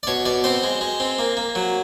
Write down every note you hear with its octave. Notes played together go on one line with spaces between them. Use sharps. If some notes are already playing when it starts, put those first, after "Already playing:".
D5
B2 C#5
B2 D5
C4 C5
G#3
G#3
C4
A#3
A#3
F#3